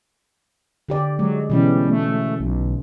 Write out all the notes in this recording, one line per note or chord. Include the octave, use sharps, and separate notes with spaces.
D3 G4 D5
F#3 G#3
B2 E3 G3 C#4
A3
B1